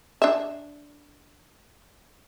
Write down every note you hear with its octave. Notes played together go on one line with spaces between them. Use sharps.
D4 E5